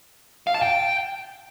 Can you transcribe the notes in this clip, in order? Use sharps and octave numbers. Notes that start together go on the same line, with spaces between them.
F5
A5
G5